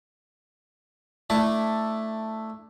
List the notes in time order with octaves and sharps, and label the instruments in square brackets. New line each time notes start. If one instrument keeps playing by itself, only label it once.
[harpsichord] A3 D4 E4 D5